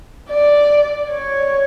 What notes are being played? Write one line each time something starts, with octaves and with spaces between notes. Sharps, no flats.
D5
C#5